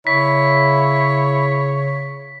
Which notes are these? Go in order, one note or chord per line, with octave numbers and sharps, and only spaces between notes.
C#3 E4 C#5 B6